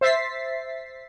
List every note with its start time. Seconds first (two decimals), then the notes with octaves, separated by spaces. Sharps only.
0.01 C5 E5 A6 B6 C7